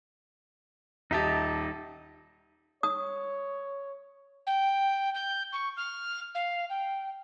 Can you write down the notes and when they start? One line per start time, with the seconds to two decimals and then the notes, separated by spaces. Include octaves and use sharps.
1.11 D#1 D#4 G4 D#5 E5 A5
2.83 C#5 D#6
4.47 G5
5.15 G6
5.53 C#6
5.77 F6
6.35 F5
6.70 G5